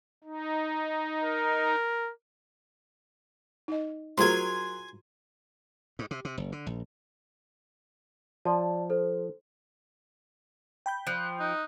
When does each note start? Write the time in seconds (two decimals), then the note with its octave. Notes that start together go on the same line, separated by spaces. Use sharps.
0.24 D#4
1.24 A#4
3.68 D#4 D#5
4.18 F#3 F4 F#4 G#4 A#4 C5 G#5 C6
5.99 G#2
6.11 C3
6.25 C3
6.38 F#1
6.52 D3
6.67 A#1
8.45 F3 D5 A5
8.90 A4 C5
10.86 G5 B5 G6
11.07 F3 F#6
11.40 D#4 F#6